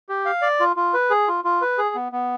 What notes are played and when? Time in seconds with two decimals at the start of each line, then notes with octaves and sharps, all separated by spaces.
0.09 G4
0.26 F5
0.42 D5
0.60 F4
0.76 F4
0.94 B4
1.10 G#4
1.28 F4
1.45 F4
1.62 B4
1.78 G#4
1.95 B3
2.12 B3